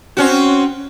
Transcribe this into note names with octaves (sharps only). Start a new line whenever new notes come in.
C4 C#4 F#4